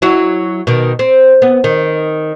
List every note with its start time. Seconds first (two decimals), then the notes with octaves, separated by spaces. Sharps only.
0.02 F#3 E4 F#4
0.67 B2 D#3
0.99 C4
1.42 B3
1.64 D#3